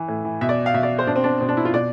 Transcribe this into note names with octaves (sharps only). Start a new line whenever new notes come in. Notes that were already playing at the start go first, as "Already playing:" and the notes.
Already playing: E3
A2
E3
B2 E5
D5
F5
B2 E5
D5
C5
B2 D4
C4
D4
B2 C4
D4
E4
F4
B2 D5